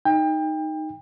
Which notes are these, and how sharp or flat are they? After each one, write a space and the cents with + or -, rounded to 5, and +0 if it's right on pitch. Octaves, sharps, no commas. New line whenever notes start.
D#4 +0 G5 +30